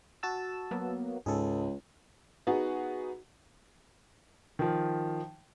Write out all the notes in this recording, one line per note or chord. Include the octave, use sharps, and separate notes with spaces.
F#4 A5 E6
F#3 A#3 B3
C#2 G#2 G#4 A4
B3 D#4 F#4 G#4
D#3 F3